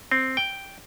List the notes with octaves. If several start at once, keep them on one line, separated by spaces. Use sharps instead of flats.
C4
G5